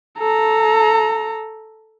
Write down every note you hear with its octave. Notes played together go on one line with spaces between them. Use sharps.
A4 A#5